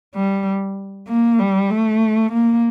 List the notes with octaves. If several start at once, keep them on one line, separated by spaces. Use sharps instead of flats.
G3
A#3
G3
A3
A#3